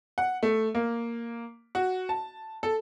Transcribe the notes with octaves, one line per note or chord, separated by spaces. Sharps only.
F#5
A3
A#3
F#4
A5
A4